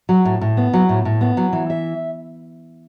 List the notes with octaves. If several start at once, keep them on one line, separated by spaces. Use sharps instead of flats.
F#3
A2
A2
B3
F#3
A2
A2
B3
F#3
E3
E5